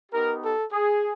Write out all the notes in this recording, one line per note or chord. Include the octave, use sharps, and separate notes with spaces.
B3 D#4 G4 A#4
A4
G#4